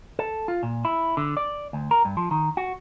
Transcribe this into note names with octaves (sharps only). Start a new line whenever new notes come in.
A4
F4
A#2
E4
D3
D5
D2
A#4
G2
F3
D#3
F#4